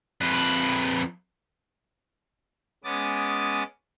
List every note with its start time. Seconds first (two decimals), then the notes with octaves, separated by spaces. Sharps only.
0.21 F2 B4
2.84 G#3 B3 C#4 D6 D#6 A6